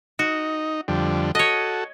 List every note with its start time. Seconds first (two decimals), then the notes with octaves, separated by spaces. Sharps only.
0.19 D#4 F#4
0.88 F2 D3 G3
1.35 F#4 A4 C#5 D#5